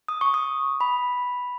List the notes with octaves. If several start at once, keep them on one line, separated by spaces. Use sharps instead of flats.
D#6
C#6
D#6
B5